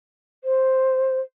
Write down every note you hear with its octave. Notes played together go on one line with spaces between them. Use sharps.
C5